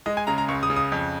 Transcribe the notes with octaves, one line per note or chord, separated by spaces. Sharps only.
G#3 D#5
G#5
C#3 A#5
A#5
C#2 C#6
D#6
C#3
D#6
F2